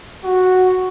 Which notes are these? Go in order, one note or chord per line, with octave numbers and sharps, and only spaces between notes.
F#4